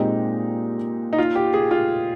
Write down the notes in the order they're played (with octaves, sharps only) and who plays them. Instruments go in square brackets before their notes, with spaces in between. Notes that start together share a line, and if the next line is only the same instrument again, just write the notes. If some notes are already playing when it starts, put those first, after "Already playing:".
Already playing: [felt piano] A#2 G#3 C4 G4 [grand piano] D#4
[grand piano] D#4
F4
G4
G#4
F4